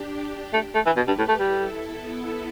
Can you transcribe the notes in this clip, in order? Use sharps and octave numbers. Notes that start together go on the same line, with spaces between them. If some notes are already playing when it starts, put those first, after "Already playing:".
Already playing: D4 G4
A3
A3
E3
B2 G4 B4
G2
A2
A3
G3 E4 A4
B3 E4